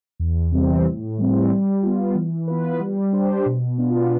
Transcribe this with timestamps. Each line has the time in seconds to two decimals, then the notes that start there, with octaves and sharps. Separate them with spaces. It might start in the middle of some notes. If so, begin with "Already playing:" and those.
0.20 E2
0.52 C3 E3 G3 C4
0.85 A2
1.18 E3 G3 C4
1.50 G3
1.83 B3 F4
2.15 E3
2.48 B3 F4 B4
2.80 G3
3.13 D4 G4 C5
3.46 B2
3.78 B3 D4 F4